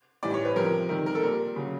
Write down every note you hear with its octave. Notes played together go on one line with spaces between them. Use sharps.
A2 E3 G3 D5
C#5
B4
C3 F3 A#4
C3 D#3 G3 A#4
A#4
A4
A#2 G3 A#4
C#3 F#3